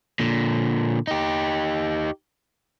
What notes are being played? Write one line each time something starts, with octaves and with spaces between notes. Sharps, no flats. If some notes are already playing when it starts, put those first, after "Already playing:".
A#2 D3
D#4 G4